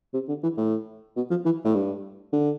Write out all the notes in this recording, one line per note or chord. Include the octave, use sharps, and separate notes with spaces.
C3
D3
E3
A2
B2
F3
E3
A2
G2
D3